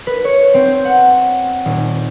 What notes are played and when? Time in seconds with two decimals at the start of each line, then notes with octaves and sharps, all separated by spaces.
0.07 B4
0.25 C#5
0.54 C4
0.85 F#5
1.65 D#1